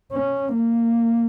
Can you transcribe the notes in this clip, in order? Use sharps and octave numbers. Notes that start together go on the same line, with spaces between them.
C#4
A#3